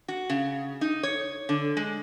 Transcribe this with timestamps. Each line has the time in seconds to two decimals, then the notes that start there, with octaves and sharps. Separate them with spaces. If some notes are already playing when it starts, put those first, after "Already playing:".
0.08 F#4
0.29 C#3
0.81 D#4
1.03 C#5
1.49 D3
1.77 G#3